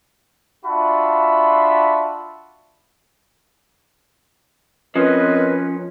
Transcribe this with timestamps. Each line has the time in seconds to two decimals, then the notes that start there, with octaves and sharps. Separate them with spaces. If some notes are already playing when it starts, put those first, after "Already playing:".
0.65 D4 F4 F#4 E5 A5 B5
4.95 F3 C4 C#4 A#4 B4 D#5